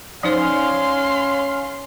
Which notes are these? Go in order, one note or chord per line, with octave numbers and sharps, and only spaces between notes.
F3 C#4 D#4 C5 F5 C6